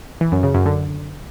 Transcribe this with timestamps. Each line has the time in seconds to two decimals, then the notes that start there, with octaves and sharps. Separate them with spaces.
0.21 E3
0.32 F#2
0.43 C#3
0.54 F#2
0.66 D3